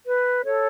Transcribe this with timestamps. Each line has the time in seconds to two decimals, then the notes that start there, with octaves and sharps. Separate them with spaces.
0.06 B4
0.45 A4 C#5